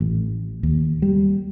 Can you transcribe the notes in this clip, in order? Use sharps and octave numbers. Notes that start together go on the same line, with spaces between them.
A1
D#2
G3